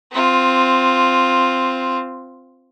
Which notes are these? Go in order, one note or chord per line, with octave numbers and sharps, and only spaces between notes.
C4 F4